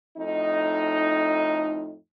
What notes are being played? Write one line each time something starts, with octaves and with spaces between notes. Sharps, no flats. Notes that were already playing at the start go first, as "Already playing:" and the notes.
F2 A2 D#4